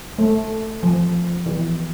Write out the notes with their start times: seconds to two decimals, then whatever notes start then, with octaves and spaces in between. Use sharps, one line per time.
0.18 A3
0.83 F3
1.46 E3